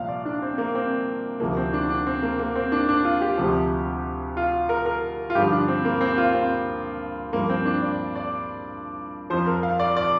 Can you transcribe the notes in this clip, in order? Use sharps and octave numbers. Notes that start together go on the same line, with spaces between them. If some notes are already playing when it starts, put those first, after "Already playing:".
Already playing: C2 A#2 F3 F5
D5
D4
C4
A#3
C4
D2 C3 F3 A#3
C4
D4
D4
C4
A#3
A#3
C4
D4
D4
F4
G4
D2 C3 F3
F4
A#4
A#4
F4
G2 D3 F3 G4
D4
C4
A#3
C4
F4
C4
G2 F3 A#3
C4
D4
D5
D5
F2 F3 C5
A#4
F5
D5
D5